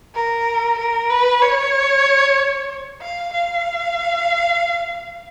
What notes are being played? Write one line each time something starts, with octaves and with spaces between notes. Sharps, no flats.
A#4
A#4
B4
C#5
F5
F5